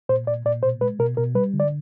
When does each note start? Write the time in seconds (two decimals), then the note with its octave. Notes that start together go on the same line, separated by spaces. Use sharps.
0.09 A#2 C5
0.27 A#2 D5
0.46 A#2 D5
0.63 B2 C5
0.81 G#3 B4
0.99 B2 A#4
1.17 B2 A#4
1.35 G3 B4
1.54 D3
1.60 D5